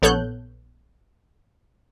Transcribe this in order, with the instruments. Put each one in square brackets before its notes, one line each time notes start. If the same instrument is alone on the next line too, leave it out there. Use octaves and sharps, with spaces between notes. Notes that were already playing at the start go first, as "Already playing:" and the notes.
[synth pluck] A#1 B3 A4 C#5 F#6 G6